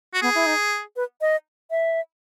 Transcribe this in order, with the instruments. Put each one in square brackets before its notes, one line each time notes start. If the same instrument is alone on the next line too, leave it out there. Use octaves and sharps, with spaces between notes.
[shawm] F#4
[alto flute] B3 [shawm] G#4
[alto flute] E4
D#4
B4
D#5
E5